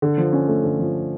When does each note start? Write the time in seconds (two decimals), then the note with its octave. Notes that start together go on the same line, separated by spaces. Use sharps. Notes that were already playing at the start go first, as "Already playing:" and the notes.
0.02 D3
0.18 F3
0.33 C#4
0.48 A3
0.64 D3
0.79 F3